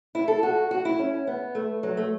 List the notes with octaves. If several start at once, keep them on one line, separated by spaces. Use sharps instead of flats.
E4
A4
F#4
F#4
E4
C#4
B3
A3
F#3
A3